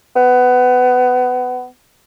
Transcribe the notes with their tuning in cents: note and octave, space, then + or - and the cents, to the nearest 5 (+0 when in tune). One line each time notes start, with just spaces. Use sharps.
B3 +20